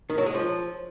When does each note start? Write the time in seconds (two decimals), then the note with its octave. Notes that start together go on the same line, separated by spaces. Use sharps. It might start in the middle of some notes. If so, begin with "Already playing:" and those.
0.10 D#3
0.18 F#3
0.26 G#3
0.35 F3